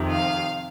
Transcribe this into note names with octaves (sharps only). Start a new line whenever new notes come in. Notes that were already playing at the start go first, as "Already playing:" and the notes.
Already playing: F2 C3 D#3
F5